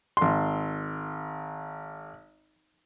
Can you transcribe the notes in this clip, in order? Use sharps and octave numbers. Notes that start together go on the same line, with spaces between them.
G#1 C6